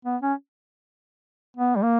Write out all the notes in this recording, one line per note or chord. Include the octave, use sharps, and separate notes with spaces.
B3
C#4
B3
G3
A#3